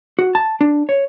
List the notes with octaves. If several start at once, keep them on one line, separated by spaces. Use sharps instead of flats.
F#4
A5
D4
C#5